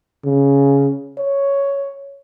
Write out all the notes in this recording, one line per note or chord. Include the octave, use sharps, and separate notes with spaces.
C#3
C#5